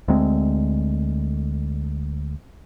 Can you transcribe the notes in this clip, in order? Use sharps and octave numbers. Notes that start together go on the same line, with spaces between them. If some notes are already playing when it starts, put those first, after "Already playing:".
D2 G#3 C4